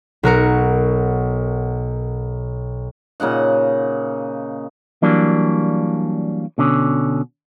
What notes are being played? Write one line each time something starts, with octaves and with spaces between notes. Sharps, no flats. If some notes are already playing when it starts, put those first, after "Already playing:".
B1 F#4 A#4 C#7
A#2 C#3 D#4 F#5
E3 F#3 G3 A#3 D4
B2 D3 C#4